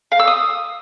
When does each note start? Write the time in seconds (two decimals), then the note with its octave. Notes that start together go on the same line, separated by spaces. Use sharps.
0.12 F5
0.20 E6
0.27 D#6